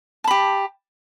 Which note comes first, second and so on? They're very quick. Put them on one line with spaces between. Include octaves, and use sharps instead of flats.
A5 B5 G4